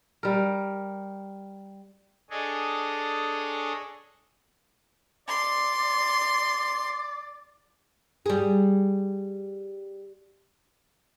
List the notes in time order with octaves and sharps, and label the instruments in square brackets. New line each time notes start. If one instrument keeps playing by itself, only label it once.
[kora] G3 A#4
[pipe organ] D4 G#4 A4 C#5 D#5
[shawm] D5 [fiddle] C6
[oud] G3 G#4